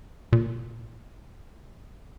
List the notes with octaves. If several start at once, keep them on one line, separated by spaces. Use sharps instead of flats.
A#2